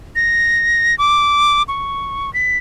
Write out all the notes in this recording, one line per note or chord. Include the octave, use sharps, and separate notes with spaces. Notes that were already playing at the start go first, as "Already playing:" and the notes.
A#6
D6
C#6
B6